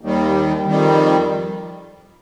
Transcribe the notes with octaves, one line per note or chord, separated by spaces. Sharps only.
D#2 D#3 G3
F2 D#3 G3